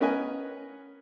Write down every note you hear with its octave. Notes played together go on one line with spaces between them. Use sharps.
B3 C#4 A#4 B4 D#5 G#5